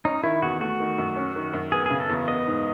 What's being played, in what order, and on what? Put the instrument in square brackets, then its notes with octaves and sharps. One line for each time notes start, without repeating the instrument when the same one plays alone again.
[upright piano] C#4 [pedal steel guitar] D#4
[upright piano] D#3 [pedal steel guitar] E4
[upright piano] E2 [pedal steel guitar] F#4
[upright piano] A3 [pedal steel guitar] F#4
[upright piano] D#3
F#2
C#4
D#3
F#2
[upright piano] B3 [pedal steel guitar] G#4
[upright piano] C#3 [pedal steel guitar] G#4
[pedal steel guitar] A4
[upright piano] E2
[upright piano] B3 [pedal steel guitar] D#5
[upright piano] G#2